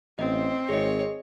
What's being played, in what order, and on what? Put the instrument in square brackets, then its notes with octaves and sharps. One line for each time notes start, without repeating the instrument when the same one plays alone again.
[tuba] A1 [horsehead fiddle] C4 [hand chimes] D#5
[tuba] G#1 [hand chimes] G#4 D#5 [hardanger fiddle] C#5